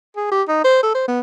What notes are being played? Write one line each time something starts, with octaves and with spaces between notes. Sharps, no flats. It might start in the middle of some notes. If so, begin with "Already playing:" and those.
G#4
G4
D#4
C5
A4
C5
B3